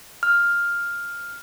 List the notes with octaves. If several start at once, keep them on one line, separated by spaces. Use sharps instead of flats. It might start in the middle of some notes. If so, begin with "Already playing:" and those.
F6